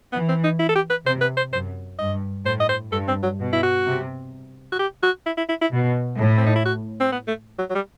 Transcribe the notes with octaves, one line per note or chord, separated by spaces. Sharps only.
E3 B3
C4
D#4
E4
A4
G4
B4
C3 C5
B4
C5
F#2 C5
G2 D#5
A2 C5
D#5
C5
G2 A4
C4
F#3
B2
E4
F#4
C3
F#4
G4
F#4
E4
E4
E4
E4
B2
A2
C4
D#4
E4
F#4
C4
B3
A3
F#3
F#3
G3